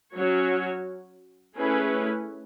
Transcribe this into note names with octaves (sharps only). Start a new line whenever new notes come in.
F#3 C#4 F#4 C#5
A3 C#4 E4 G#4 B4